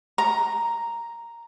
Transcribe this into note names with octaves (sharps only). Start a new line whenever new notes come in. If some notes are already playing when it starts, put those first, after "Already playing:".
A#5